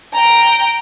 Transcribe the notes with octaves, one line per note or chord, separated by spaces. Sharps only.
G5 A#5